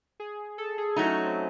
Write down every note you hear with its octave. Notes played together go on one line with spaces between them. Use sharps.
G#4
A4
G#4
F#3 A3 D#4 E4
C#4
C4